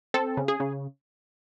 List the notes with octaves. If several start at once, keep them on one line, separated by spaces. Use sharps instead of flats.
C4 A4
C#3
G#4
C#3